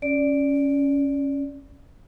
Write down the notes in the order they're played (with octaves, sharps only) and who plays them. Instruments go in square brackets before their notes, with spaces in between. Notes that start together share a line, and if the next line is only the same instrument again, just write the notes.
[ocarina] C#4 [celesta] D5 D7